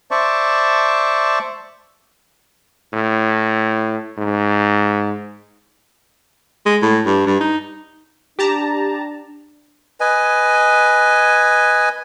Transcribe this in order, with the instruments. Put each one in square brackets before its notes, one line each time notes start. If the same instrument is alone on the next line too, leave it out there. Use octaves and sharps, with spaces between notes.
[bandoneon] C5 D5 E5 A5 C#6
[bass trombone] A2
G#2
[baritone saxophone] G#3
A2
G2
G2
D#4
[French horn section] D4 [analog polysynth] G4 A5 A#5
[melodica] B4 D#5 G#5